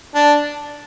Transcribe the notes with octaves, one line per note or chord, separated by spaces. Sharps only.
D4